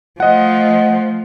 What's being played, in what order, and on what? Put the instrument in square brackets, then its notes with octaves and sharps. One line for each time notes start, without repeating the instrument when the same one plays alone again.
[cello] F3 A3 [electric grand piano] D#5 F#5